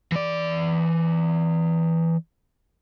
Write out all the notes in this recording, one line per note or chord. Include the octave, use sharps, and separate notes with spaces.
E3 D5